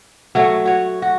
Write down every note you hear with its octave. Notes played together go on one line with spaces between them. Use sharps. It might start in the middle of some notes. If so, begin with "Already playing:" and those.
F#3 A3 C#5
F#4 C#5
F#4